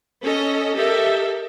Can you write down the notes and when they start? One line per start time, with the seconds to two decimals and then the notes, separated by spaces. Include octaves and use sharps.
0.22 C#4 A4 D#5
0.75 G4 A4 A#4 D#5 E5